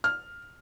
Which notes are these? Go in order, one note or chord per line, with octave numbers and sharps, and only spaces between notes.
F6